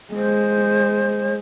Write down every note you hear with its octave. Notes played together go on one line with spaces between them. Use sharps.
G#3 C5